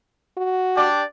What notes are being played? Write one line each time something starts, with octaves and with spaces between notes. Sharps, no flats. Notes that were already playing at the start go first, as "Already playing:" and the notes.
F#4
D4 G4 D5